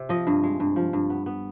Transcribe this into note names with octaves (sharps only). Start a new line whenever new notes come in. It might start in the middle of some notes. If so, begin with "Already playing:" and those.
Already playing: C3
F3 D#5
G2
G#3
G2
F3
G2
B3
B3